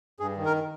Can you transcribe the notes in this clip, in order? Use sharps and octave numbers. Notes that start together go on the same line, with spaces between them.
G2 G#4
D#3
A#4